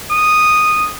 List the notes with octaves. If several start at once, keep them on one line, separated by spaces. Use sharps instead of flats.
D#6